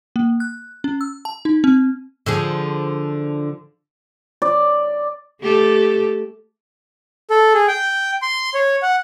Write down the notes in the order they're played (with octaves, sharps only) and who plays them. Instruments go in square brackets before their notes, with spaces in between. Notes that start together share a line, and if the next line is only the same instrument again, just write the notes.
[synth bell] A#3
F#6
C#4
E6
A5
D#4
C4
[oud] D3 F3 G#4
[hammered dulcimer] D5
[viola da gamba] A3 G4 A4
[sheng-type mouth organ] A4
G#4
G5
C6
C#5
F#5